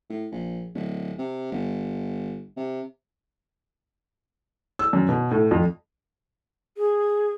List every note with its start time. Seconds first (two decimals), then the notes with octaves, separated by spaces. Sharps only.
0.10 A2
0.32 A#1
0.74 D1
1.18 C3
1.52 G1
2.57 C3
4.79 E6
4.93 F#2
5.09 B2
5.31 A2
5.51 F2
6.77 G#4